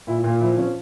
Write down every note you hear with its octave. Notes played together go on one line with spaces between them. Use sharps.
A#2 E4
A#2 F4
F3 E4
F3 C#4